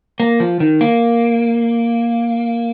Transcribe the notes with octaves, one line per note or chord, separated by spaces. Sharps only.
A#3
F3
D#3
A#3